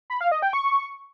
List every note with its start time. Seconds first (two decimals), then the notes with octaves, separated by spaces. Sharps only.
0.10 B5
0.21 F5
0.32 D#5
0.42 G5
0.53 C#6